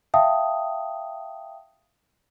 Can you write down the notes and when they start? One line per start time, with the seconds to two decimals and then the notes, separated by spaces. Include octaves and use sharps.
0.14 E5 F5 G5 A5 D#6